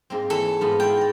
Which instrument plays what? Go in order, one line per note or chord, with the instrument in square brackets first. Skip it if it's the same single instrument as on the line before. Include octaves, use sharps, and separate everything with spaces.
[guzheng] G#2 A#3 C4
[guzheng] E3 C#5 [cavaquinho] A4
[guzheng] G#2 B3 F4
[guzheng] E4 F4 [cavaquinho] G5
[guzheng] D5 A#5